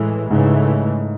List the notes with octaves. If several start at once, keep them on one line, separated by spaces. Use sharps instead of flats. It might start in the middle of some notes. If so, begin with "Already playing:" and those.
Already playing: A2 E3 G#3
G#2 C#3 E3 A3